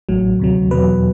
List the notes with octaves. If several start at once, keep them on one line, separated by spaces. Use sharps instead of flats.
A1 A2 F#3
D2 C3 F#3
E2 B2 F#3 B4